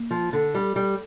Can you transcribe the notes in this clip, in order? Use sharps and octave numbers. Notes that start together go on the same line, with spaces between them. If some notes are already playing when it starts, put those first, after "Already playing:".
Already playing: A#3
F3
D3
G3
G3